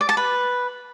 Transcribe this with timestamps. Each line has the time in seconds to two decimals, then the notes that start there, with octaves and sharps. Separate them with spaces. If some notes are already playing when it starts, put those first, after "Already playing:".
0.01 D5
0.09 A5
0.17 B4